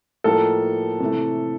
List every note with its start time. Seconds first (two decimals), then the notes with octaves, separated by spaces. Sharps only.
0.24 A2 F3 A#3 D#4 A4
1.00 C3 E3 A3